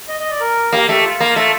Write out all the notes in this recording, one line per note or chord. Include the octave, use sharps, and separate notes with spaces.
D#5
D#5
D5
A#4
A#3 G4
A3 G4
F4
A#3
A3